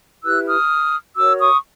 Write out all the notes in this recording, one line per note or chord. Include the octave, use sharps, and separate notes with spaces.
E4 G4 B4 E6 F#6
D#6 F6
F#4 A#4 C#5 D6 E6
C#6 D#6